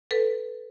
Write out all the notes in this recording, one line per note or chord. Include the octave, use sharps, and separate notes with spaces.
A4 B4